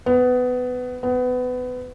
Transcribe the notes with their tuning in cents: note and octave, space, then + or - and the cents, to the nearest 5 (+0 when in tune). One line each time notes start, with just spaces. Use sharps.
B3 +20
B3 +25